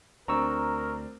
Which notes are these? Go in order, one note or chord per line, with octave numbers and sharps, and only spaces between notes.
D2 C4 D4 A#4 A#5 C#6 E6